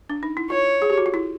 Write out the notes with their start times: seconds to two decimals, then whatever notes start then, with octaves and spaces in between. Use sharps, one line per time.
0.10 D4
0.23 D#4
0.37 E4
0.50 F4 C#5
0.82 G#4
0.90 G4
0.98 F#4
1.06 F4
1.14 E4